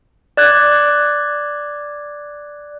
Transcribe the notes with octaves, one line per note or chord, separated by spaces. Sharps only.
D5 F#6 G#6